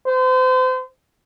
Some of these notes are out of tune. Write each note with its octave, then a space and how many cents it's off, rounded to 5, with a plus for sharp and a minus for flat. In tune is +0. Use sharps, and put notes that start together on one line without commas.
C5 -35